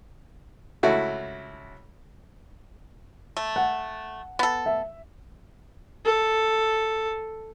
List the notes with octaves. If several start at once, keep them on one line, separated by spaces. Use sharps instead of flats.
C#2 A3 E4 F#4
A3
F#5
B3 A4
E5
A4